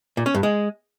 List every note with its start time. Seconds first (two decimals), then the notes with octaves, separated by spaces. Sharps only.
0.17 A#2
0.26 C#4
0.35 G2
0.43 G#3